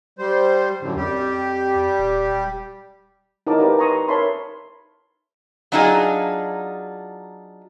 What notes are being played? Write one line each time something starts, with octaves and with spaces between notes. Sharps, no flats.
G3 C5
F#2 A2 D3
F2 G3 G4
D#1
D#4 E4 A#4 C#5 A5 D6
E4 G4 A#4 B4 D5 F5
B4 G#5 A#5 C6 C#6 D#6
A#4 C#5 E5 A5 B5 C6
F#3 D4 D#4 F4 G#4